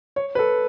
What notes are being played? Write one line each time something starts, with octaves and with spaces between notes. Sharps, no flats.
C#5
B4
A4